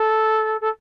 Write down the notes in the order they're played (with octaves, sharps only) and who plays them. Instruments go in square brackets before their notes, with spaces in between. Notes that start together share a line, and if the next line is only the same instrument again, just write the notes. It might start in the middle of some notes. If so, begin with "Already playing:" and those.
Already playing: [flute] A4
A4